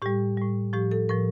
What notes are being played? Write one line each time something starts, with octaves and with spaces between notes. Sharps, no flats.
A2 G3 G4
A2 G3
A2 F3 G4
A4
A2 F3 A#4